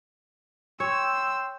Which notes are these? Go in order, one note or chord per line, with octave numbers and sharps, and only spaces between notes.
C#5 G5 C6 E6